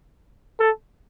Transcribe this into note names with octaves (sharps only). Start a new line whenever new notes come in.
A4